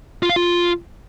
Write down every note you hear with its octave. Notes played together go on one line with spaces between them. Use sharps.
F4
F5
F4